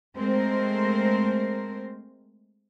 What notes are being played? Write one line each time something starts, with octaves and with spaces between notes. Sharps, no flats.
G#3 A3 C4 A#4 C5